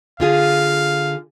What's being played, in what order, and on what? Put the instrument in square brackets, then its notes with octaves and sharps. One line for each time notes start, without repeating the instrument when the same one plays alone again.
[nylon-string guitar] D3 F4 G#4 [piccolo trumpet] F5